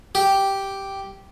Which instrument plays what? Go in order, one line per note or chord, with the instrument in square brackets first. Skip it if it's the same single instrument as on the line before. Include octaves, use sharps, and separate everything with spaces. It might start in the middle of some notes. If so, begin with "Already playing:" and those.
[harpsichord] G4